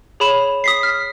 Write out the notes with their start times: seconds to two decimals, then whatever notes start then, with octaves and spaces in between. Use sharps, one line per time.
0.20 G#4 C#5 B5 E7
0.64 D#6 B6 C7
0.83 F6 B6